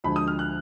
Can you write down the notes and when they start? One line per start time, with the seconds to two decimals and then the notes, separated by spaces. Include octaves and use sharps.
0.04 D2 D3 F3 G#3 B5
0.16 D#6
0.27 F6
0.39 F#6